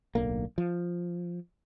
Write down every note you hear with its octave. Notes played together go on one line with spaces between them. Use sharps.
D1 B1 D3 A#3
F3